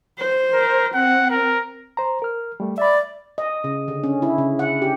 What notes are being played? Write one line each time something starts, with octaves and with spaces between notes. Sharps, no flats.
C5
A#4
C4 F#5
A#4
C5 A#5
A#4 F6
G3 A3
D5 E5 B5
D#5
C#3
D3
C#4
E4
C#3
F#5
G4